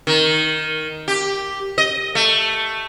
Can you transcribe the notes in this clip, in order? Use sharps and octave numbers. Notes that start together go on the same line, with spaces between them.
D#3
G4
D#5
A3